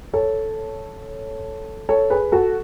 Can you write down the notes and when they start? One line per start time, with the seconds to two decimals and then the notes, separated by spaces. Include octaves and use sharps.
0.13 A4 C#5
1.89 A4 C#5
2.10 G#4 B4
2.32 F#4 A4